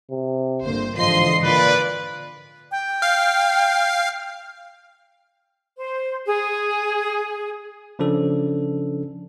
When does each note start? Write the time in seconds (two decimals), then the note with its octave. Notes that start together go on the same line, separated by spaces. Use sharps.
0.11 C3
0.65 G1 D3 A#3 C5
0.97 G#2 D3 E3 F3 D#5 C6 C7
1.44 A#2 B4 D5
2.72 G5
3.02 F5
5.78 C5
6.26 G#4
7.99 C#3 F3 C#4 D4 A4